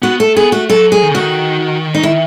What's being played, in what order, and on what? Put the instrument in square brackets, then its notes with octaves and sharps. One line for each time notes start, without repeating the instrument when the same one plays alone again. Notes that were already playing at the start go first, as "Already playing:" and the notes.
[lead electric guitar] B3 [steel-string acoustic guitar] F#4
[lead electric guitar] A3 [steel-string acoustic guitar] A4
[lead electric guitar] B3 [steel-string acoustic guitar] G#4
[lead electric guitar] A3 [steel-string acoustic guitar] F#4
[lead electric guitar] F#3 [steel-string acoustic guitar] A4
[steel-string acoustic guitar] G#4
[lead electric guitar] D#3
C#3
[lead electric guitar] D#3 [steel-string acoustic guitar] F#4
[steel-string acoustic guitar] D#4
E4